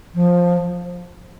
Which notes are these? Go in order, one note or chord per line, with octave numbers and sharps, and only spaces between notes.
F3